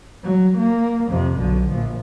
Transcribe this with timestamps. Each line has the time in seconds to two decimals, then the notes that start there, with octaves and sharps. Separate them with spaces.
0.24 F#3
0.57 A#3
1.08 F2 C3
1.38 B1 D3
1.69 A#1 F3